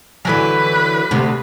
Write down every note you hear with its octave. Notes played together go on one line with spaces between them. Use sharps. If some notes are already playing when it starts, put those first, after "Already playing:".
D3 E3 F#3 B4
D2 C3